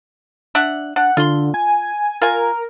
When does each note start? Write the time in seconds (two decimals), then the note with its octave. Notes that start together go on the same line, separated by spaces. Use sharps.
0.55 D4 E5 F#5
0.96 D4 F#5
1.17 D3 F4 C6
1.54 G#5
2.22 F4 A#4 G#5